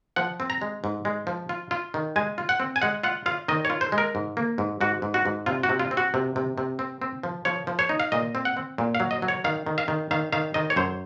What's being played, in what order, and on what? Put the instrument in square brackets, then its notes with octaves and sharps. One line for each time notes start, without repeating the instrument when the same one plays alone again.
[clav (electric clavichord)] F3 F#5
C4
A#5
G#3
G#2
G#3
F3
F4
F4
D#3
G#3 G#5
F4
F#5
C4
G#5
G#3 F#5
F4 F#5
F4 F5
D#3 D#5
C#5
F4
C5
G#3
A#4
G#2
A#3
G#2
G#2 F#4
G#2
F#4
G#2
C3 F4
F#4
C3
F4
C4
F#4
C3
C3
C3
C4
C4
F3
F3 C#5
F3
C#5
D#4
F5
A#2 D#5
C4
F#5
C4
A#2
F5
F#3
D#5
F#3
C#5
D#3 F5
D#3
F5
D#3
D#3 F5
D#3 F5
D#3 D#5
C#5
F#2 C5